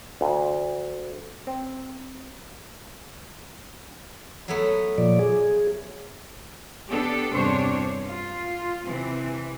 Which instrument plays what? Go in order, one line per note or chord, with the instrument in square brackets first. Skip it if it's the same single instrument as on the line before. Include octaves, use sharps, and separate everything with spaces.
[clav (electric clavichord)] D2
C4
[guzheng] F#3 A3 B3
[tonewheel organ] A#2 F3 D5
G#4
[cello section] B3 D4 G4 A4
E2 G2 C3 D4 C5 C#5
F4
C3 E3 C4